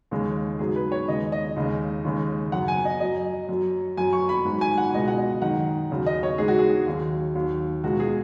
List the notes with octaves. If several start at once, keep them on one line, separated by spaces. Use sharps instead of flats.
D#2 C#3 G#3
G#2 F#3 G#4
B4
C#5
D#2 C#3 G#3 D#5
D#5
D#2 C#3 G#3
D#2 C#3 G#3
F#2 F#3 F#5
G#5
D#5
F#2 F#3 D#5
F#2 F#3
F#2 F#3 G#5
C#6
B5
G#2
F#3
G#5
F#5
C#2 B2 G#3 D#5
F#5
D#5
F#2 D#3 G#3 F#5
D#2 C#3 F#3
D#5
C#5
G#2 G#3 G#4
F#4
G#4
D#2 D#3 F#3
D#2 D#3 F#3
C#2 B2 G#3 F#4
G#4